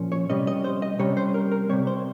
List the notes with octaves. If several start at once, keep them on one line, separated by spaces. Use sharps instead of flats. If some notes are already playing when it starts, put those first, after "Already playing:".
Already playing: A#2 F3 A#3 C#4
C#5
C3 G3 C#4 D#5
D#5
C5
D#5
C3 G3 C#4 C#5
C5
A#4
A#4
C3 G3 C4 C#5
C5